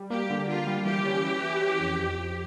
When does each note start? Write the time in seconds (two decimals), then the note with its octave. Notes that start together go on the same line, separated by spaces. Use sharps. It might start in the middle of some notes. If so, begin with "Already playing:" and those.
Already playing: G3
0.10 A#3 G4
0.30 D3
0.49 A#3 F4
0.67 G3
0.86 E3 G4
1.05 C#4
1.24 E3
1.42 E3
1.61 C#4
1.80 F2
1.99 F2
2.18 F2